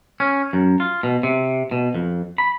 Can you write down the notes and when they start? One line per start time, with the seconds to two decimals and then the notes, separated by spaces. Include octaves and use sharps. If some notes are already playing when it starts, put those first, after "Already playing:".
0.20 C#4
0.53 F#2
0.80 F4
1.03 B2
1.23 C3
1.71 B2
1.95 F2
2.38 B5